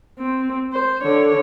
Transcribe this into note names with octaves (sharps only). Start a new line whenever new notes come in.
C4
C5
D3 C#5